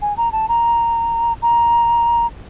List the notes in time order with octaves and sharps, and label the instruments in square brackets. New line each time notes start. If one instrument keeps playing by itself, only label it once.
[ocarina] G#5
A#5
A5
A#5
A#5